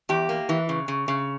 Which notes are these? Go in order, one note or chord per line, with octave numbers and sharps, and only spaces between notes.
E2 G4
A#3
E3
C#3
C#3
C#3